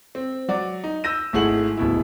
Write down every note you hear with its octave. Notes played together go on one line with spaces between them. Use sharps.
C4
F#3 F#4 D5
D#4
E6 G6 A#6 D#7
G#1 A3 E4 G#4 F#5 F#7
D1 B2 E4